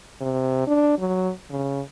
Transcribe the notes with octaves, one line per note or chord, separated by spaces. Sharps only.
C3
D4
F#3
C#3